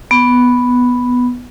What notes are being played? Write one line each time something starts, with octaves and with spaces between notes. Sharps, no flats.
B3